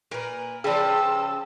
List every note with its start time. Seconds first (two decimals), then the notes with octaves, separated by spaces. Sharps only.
0.11 A#2 A#4 B4
0.64 C#3 F3 G4 G#4 B4 D5 A5 E6